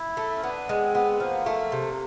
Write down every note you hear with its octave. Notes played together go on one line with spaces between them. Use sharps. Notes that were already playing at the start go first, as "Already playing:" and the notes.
Already playing: E4
A3
C#4
B3 D4
G#3
C4
B3
F3 A#3
A3
C3